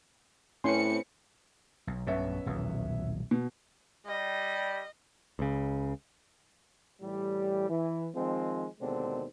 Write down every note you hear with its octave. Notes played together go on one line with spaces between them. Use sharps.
A2 C4 C#4 B4 G#5 C6 C#7
B1
B1 G2 B2 B3 C#4 E5
D#1 B1 E2
B2
G3 D#5
C#2 C#3
A2 E3 G3
E3
D#3 F3 G#3 C4
D#2 B2 D3 G#3 C4